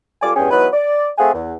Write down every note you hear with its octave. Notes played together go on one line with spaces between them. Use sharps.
C#2 G3 F4 A4 G#5 D6
E2 G2 C#4 G#4 G5 G#5
E3 F#3 B3 D#4 B4
D5
A3 C4 G#4 F5 F#5 G#5
E2